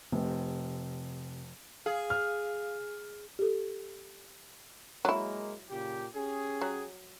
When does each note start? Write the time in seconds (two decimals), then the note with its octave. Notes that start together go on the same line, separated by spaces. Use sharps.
0.12 F1 C3
1.86 G#4 F5
2.10 F6
3.39 G4 A4
5.05 F#3 G#3 A#3 E4
5.70 A#2 C#3 G4
6.15 C#4 G4 G#4
6.61 F#3